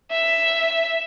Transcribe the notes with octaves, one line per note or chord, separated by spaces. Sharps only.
E5